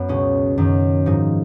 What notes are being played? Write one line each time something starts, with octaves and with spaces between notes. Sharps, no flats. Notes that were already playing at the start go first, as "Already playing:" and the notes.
Already playing: F#2 B3
C#2 B2 C#4
F#2 D#3
G#2 F3 D#4